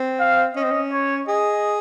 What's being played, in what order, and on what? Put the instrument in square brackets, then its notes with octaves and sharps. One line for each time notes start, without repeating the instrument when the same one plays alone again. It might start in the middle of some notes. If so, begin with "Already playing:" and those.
Already playing: [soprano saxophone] C4
[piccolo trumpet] F5
[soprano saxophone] C#4 [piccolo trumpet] D#5
[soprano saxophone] C4
C#4
[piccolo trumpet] C#5
[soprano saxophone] G#4 [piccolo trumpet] D#5